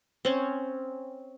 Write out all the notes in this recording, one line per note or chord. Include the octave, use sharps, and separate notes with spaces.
C4 C#4